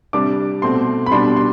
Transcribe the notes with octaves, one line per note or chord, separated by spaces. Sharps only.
C3 G3 D4 D6
B2 A3 C4 C6
B5
B2 G3 D4 C6
C6